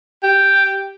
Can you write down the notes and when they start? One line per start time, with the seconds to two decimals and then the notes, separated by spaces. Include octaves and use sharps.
0.23 G4